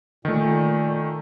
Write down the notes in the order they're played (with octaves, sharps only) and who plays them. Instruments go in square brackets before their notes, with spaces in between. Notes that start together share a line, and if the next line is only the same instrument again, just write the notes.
[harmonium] A#2 [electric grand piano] D#3 A3